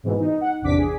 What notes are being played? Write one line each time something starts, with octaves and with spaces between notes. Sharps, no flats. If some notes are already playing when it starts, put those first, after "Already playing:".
G#2 B2 E3 G#3
D#4
F#5
A1 E2 C3 D4 D6 B6
G#4